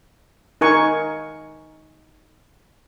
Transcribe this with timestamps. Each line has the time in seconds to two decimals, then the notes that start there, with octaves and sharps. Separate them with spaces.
0.61 D#4 A#4 G#5 C#6